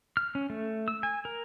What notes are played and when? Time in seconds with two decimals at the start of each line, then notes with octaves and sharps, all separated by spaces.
0.17 F6
0.35 C#4
0.50 A3
0.88 E6
1.03 G#5
1.25 A#4